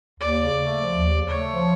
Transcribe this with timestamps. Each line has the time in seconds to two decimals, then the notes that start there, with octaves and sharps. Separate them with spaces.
0.20 D#2 D5
0.38 C#3
0.56 A3
0.75 F3
0.93 D#2
1.10 C#3
1.29 A3 C#5
1.47 F3